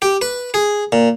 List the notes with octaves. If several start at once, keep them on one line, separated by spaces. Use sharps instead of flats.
G4
B4
G#4
A#2